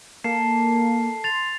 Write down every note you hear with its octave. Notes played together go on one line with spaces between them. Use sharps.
A#3 A4 C7
C6 A6 F7